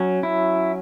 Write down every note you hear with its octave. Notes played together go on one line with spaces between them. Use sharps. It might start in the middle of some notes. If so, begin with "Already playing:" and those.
Already playing: F#3 C#4
E4